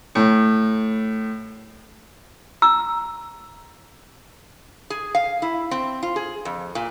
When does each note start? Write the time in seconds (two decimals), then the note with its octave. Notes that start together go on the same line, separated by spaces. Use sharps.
0.15 A2
2.62 A#5 E6
4.90 G#4
5.15 F5
5.42 E4
5.71 C4
6.03 F4
6.16 G#4
6.45 F2
6.75 A#2